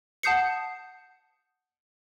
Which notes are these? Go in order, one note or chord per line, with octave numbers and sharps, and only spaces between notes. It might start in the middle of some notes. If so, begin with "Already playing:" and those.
F#5 A5 D#6 G6 C7 C#7